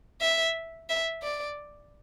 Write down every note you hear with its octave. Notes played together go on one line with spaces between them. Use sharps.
E5
E5
D5